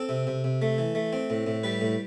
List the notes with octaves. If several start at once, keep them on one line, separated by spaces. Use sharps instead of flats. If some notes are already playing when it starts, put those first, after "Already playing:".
Already playing: C4 A4
C3
C3
C3
A3
E3
A3
C4
A2
A2
G3 B4
A2